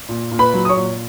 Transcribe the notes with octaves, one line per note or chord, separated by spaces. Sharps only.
A#2
A#2
B4 B5
F#3
D#6
C#5 C#6
A#2